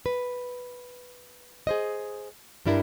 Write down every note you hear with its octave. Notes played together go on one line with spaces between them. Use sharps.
B4
G#4 C5 D#5
G2 G3 D4 E4 A4 A#4